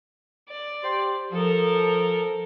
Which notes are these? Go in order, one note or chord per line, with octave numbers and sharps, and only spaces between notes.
D5
G4 C5 C6
F3 A4 A#4